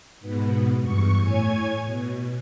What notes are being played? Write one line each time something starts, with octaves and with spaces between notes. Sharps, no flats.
G#2 B2 B3
E2 G2 C#6
A2 C#5 G#5 G#6
B2